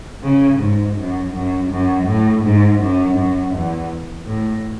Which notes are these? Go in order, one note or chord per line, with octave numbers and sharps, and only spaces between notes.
C#3
G#2
F#2
F#2
F#2
A2
G#2
F#2
F#2
E2
A2